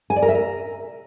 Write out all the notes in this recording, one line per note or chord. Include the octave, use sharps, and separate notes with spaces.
G#5
D5
A#4
E5
A#4